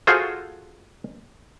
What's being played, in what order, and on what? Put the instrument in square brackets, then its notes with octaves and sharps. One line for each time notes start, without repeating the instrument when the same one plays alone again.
[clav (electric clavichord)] F4 F#4 G#4 A4 C5